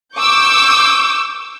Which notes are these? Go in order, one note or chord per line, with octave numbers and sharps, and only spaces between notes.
C#6 D6 E6 G6